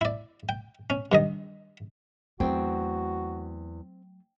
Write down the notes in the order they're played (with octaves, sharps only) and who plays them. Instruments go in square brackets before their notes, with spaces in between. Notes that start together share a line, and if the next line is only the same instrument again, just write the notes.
[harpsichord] E4 D5
G5
C#4
G2 D#3 D#5
[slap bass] E2 [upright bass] F#3 A3 [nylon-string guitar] C4 [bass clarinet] F#4